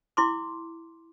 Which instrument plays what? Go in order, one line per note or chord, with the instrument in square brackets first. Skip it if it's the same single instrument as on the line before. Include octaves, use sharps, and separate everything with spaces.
[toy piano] E4 C6 D6